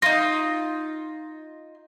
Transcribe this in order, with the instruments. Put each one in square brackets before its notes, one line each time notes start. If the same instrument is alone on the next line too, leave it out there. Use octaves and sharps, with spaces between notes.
[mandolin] D#4 F4 [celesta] A#6